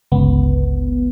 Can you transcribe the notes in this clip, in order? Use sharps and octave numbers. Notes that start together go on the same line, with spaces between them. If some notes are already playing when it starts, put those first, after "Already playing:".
G1 C#2 B3